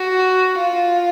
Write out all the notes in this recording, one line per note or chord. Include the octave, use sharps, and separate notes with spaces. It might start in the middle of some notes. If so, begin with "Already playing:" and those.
Already playing: F#4
F4